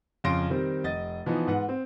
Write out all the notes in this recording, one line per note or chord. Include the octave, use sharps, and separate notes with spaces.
F2 C#3 F4 C6 A#6 D7
D#3 G3 C4
F1 D#5 A6
E3 F3 B3 D#4
G#2 B4 F#5
C4